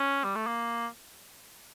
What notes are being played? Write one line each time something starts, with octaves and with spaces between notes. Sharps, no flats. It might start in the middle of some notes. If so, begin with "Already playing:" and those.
Already playing: C#4
G3
A3
A#3